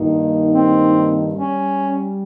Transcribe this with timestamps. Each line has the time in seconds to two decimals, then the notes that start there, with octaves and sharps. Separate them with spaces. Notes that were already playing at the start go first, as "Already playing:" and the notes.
Already playing: G2 D#3 A#3 D#4
0.53 C4
1.34 G3 C#4